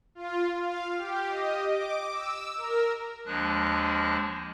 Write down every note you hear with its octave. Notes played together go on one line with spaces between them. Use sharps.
F4
F5
G4
D#5
D6
E6
A#4
D#2 F3 G#3 D4 F#6